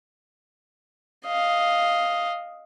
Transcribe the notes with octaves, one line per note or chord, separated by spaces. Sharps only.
D#5 F5